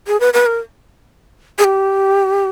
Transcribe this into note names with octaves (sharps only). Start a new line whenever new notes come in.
G#4
B4
B4
A#4
G#4
G4